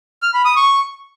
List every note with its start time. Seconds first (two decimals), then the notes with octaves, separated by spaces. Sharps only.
0.22 F6
0.34 B5
0.45 D#6
0.56 C#6